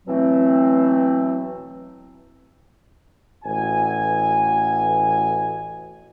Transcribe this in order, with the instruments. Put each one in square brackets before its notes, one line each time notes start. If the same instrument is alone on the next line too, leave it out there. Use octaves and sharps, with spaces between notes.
[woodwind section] B2 E3 F#3 A3 C4
[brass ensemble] A1 F#4 G#5